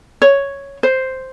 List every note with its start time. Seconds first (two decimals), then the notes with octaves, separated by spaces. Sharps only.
0.22 C#5
0.83 C5